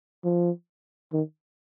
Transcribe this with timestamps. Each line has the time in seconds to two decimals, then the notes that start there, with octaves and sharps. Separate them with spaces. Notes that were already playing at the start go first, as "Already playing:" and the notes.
0.24 F3
1.13 D#3